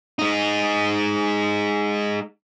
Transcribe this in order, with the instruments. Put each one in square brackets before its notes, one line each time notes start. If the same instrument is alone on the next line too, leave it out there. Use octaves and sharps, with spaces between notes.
[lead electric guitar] G#3 D#4